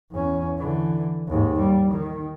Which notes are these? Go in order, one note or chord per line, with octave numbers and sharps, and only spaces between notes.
E2 C#4
D3 E3
D#2 G#2
G3
D#3